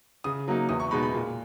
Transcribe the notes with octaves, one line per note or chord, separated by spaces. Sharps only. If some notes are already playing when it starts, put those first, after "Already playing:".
C#3 D#6
F#3 A#3 D#4
E2 D#6
C#6
B2 G#3 D#4 B5
B5
A#2